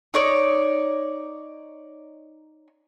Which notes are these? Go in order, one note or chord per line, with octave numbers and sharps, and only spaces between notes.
D#4 C#5 D5